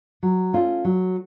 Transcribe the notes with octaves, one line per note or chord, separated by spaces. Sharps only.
F#3
A3 C#4 F4
F#3